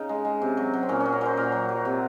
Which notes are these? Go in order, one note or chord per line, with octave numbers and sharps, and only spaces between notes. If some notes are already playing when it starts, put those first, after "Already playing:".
Already playing: C#3 D#4
G#3
G#3
C3
F#3
F#3
C4
A#2 C#4
F#3 C#4
A#4
F#3 C5
A#2 A#4
F#3
F#3
C3